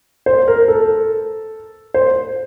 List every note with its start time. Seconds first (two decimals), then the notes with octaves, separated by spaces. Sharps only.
0.26 C5
0.48 A#4
0.68 A4
1.94 C5